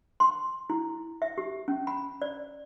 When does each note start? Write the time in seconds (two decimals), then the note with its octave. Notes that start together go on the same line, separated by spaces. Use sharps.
0.20 C6
0.70 E4
1.22 E5
1.38 G4
1.68 C#4
1.87 B5
2.22 D5